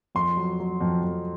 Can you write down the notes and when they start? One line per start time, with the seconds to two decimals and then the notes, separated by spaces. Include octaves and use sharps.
0.15 F2 C6
0.37 F#3
0.60 F#3
0.81 F2
1.03 F2